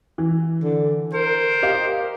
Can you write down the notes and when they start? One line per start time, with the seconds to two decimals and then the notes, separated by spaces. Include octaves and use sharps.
0.18 E3
0.63 D3
1.13 A#4 C5
1.63 G4 D#5 F5